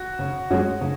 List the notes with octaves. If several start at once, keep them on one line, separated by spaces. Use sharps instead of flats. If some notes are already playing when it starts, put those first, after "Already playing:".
Already playing: F#4
C#3
G#3 C#4 F#4
C#3